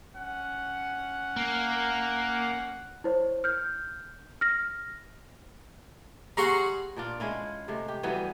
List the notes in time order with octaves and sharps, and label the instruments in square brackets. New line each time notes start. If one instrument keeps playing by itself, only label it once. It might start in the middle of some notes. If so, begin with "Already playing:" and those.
[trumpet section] C#4 F#5
[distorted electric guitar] A#3
[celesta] E4 C5 C#5
F6 G6
F6 A#6
[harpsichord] G3 G#4 F#5 [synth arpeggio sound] A#5 C6 C#6
[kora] A#2 D4 F4
G#3 C#4 E4 F4
C3 G#3 A3
G4
E3 F#3 G3 B3